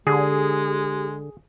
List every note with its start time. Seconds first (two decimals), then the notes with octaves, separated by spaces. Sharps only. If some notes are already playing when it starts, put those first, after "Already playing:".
0.07 D3 G#3 G4 G#4